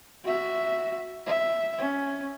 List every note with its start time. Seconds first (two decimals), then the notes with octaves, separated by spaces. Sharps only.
0.25 F#4 E5
1.26 E5
1.78 C#4